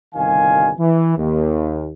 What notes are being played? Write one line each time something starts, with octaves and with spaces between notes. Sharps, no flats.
G1 C2 D#3 F5 G#5
E3
D#2